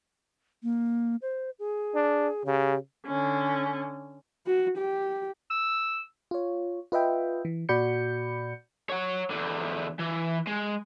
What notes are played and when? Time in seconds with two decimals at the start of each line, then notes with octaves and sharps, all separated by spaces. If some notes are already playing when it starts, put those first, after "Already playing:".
0.63 A#3
1.22 C5
1.59 G#4
1.95 D4
2.46 C#3 G4
3.07 D3 C#4
4.46 F#4
4.78 G4
5.51 E6
6.31 F4 C#5
6.92 F4 B4 D#5 E5 G5
7.45 E3
7.69 A#2 F#4 D5 B5 G6 C#7
8.89 C#5 F#5
9.30 E2 D3
10.00 E3
10.47 G#3